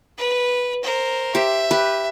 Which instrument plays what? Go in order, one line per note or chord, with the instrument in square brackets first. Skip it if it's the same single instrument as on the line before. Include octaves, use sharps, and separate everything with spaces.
[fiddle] B4
A#4 C5
[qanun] G4 C5 [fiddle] E5
[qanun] G4 B4